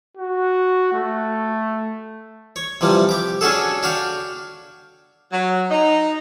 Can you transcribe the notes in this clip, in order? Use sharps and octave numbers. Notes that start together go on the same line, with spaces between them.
F#4
A3
C#5
C3 E3 F3 G3
G4 D6
C#4 D4 F#4 G#4 A4
D4 F#4 F5 G5
F#3
D#4